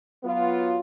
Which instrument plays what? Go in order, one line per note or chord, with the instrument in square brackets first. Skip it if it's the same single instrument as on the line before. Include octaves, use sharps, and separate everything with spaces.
[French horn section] F#3 B3 F4